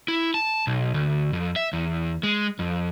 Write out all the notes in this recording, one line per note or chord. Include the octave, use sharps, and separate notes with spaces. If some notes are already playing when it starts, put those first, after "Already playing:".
E4
A5
B1
D2
F2
E5
E2
G#3
F2